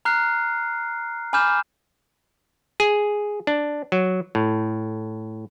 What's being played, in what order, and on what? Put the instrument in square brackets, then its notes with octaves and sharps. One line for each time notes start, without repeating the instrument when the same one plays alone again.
[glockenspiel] A#5 F6 F#6 C7
G#5 B5 D6 F6 G6 E7
[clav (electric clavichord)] G#4
D4
F#3
A2